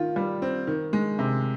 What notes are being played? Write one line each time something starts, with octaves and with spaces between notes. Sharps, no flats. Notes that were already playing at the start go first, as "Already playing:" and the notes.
Already playing: D#3 F4
G3
C4
D#3
G#3
C3